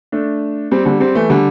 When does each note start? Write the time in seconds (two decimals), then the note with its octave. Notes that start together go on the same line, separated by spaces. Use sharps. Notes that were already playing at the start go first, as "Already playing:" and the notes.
0.12 A3 D4
0.71 G3 C4
0.86 D3 G3
1.00 G3 C4
1.15 E3 A3
1.30 D3 G3